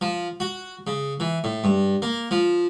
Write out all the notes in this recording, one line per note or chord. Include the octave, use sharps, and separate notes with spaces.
F3
F#4
C#3
E3
A2
G2
A#3
F3